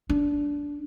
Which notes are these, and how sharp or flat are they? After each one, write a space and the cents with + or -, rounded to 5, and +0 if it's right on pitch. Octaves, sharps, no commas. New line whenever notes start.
D4 -15